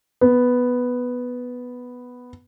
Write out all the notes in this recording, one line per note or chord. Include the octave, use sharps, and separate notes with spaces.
B3